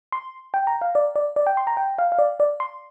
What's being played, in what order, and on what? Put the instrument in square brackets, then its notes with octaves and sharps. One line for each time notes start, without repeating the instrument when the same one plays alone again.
[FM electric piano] C6
G5
A#5
F5
D5
D5
D5
G5
C6
A#5
G5
F5
F5
D5
D5
C6